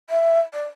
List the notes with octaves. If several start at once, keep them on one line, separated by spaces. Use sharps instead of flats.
E5
D5